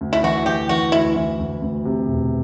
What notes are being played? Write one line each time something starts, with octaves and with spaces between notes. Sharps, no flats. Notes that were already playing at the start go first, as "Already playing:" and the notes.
D2
E4
E3 F#4
E3 G4
E3 F#4
D2 E4
E3
D2
D2
C3
E1